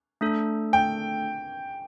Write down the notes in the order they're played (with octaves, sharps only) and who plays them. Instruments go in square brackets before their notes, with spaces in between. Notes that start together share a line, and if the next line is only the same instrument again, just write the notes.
[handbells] A3 D4 A4
[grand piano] G5